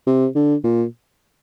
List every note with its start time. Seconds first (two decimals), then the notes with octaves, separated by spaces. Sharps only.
0.07 C3
0.35 D3
0.64 A#2